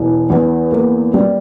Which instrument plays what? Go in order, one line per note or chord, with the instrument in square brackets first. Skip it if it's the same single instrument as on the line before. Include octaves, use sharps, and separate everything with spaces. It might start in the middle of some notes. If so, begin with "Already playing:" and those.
Already playing: [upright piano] E1 E3
E2
A#3
G3